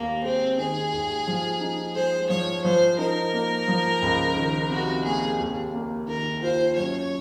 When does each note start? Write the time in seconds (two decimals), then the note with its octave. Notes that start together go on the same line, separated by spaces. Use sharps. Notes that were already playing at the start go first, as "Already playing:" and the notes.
Already playing: D#2 A#3
0.24 G#3 C4
0.58 D#3 G#4
0.93 D#2
1.27 F3
1.61 D#4
1.95 G#3 C5
2.30 F3 C#5
2.64 F3 C5
2.98 D#4 A#4
3.33 A#3
3.68 F3
4.02 C#2
4.36 D#3
4.70 C3 F#4
5.04 A#3 G#4
5.39 D#2
5.73 A#3
6.07 D#3 A#4
6.42 F4 C5
6.76 F#2 C#5